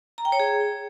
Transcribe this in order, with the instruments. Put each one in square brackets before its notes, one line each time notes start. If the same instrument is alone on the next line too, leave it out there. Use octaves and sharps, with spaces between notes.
[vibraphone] A#5
G5
C#5
G#4